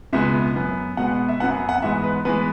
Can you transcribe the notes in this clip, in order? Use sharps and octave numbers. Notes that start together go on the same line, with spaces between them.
C#2 B2 G#3 B3 E5
F#2 F#3 B3
B2 G#3 B3 F#5
E5
F#2 F#3 B3 F#5
F#5
G#2 E3 G#3 B3 E5
B4
E3 G#3 B3 B4